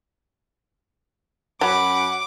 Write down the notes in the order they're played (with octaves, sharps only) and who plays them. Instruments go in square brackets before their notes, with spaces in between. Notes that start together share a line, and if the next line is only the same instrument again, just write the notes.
[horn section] F#2 B5 [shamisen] F#3 [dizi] F#5 [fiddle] D6